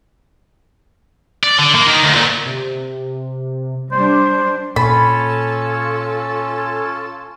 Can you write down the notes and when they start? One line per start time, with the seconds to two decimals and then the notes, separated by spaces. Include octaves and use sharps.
1.44 D5
1.59 D3
1.75 A#3
1.87 D#3
2.04 D2
2.15 A#2
2.46 C3
3.92 G3 D4 C5 D5
4.76 A#2 C#4 F4 A4 B5